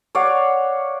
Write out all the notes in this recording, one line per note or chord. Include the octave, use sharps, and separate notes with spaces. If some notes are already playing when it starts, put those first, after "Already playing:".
C#5 D5 F5 F#5